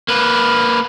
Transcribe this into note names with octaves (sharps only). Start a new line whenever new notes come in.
A#3 B4